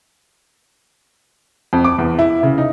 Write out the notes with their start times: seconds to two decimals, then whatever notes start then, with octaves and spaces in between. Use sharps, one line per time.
1.73 F2
1.85 D6
1.98 E2
2.19 E4
2.43 C#3
2.58 D#4